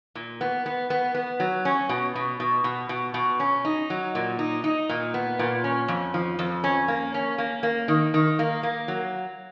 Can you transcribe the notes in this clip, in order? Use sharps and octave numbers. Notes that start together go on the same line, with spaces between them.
A#2
B3
B3
B3
B3
F#3
C#4
B2
B2
B2
B2
B2
B2
C#4
D#4
F#3
A#2
D#4
D#4
A#2
B3
A#2
C#4
F2
F3
F2
C#4
A#3
C#4
A#3
A#3
D#3
D#3
A#3
A#3
F#3